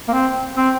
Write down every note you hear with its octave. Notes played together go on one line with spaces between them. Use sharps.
A#3
C4
C4